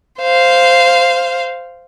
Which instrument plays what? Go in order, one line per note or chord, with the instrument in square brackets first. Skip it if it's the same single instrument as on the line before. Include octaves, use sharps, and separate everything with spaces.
[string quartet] C5 F5